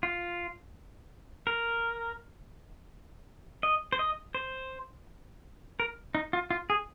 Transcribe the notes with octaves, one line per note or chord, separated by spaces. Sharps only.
F4
A#4
D#5
C5
D#5
C5
A#4
D#4
F4
F4
G#4